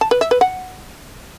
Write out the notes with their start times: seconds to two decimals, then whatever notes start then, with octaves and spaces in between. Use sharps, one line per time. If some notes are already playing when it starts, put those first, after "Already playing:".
0.01 A5
0.11 B4
0.21 E5
0.31 B4
0.41 F#5